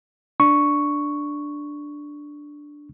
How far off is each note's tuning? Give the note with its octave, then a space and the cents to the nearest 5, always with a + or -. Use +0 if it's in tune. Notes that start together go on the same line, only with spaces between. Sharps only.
D4 +0 C#6 +0